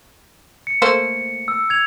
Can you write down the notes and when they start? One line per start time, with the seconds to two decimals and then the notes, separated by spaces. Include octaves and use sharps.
0.67 C#7
0.82 A3 A#3 C5
1.48 E6
1.70 G#6 F7